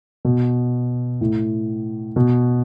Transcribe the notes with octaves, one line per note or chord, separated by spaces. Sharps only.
B2
A2
B2